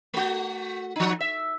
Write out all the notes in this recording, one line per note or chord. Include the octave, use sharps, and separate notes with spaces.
A3 F#4
F3 D#4
E5